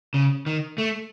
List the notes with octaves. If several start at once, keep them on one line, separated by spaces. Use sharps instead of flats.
C#3
D#3
A3